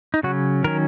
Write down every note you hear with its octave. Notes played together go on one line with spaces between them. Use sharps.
D#4
C#3 F#3 C#4 F#4
D#3 F#3 C#4 A#4